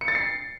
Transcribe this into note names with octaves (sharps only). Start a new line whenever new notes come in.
C#7
A6
C7